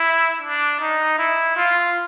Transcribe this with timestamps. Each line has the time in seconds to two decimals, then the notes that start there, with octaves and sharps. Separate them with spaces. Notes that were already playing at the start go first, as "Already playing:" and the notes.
Already playing: E4
0.41 D4
0.80 D#4
1.18 E4
1.56 F4